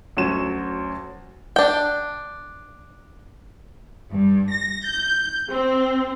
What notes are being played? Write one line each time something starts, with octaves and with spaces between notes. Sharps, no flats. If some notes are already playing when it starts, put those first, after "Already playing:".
D2 F#3 C#4 E7
D4 G5
G2
A#6
G6
C4